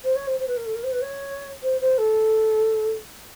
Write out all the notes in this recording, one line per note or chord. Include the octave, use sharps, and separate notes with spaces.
C5
C#5
C5
C5
B4
A#4
A4
A#4
C5
B4
C#5
C5
C5
A4